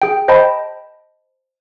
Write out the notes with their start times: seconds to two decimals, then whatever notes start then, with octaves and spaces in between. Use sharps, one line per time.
0.02 G#4 G5
0.28 C5 D#5 G5 A5 B5